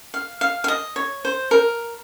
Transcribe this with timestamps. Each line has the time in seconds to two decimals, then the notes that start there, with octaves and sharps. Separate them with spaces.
0.14 F5
0.41 F5
0.64 F5
0.68 D#5
0.96 C#5
1.25 C5
1.51 A#4